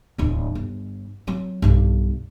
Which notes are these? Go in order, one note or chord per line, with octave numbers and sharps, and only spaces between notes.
D1 E2
G1
F#3 C4
B1 G2